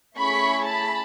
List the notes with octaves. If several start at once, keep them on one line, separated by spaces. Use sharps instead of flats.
A3 C#4 E4 G#4 B5 C#6
A5 B5